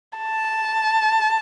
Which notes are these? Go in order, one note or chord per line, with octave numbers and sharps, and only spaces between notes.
A5